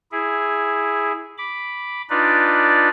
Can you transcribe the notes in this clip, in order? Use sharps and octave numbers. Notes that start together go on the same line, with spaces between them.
E4 G#4
B5 D6
D4 D#4 F4 B4 D5